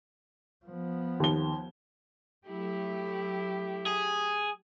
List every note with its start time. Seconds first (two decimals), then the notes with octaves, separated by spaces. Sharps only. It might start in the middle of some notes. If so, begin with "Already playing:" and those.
0.66 F3 B3
1.20 D#2 G7
2.47 F#3 A3 E4 G4
3.86 G#4